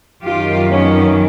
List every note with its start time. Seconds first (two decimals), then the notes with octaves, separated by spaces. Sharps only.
0.23 F#2 D#3 F4 G4
0.69 B3 C#4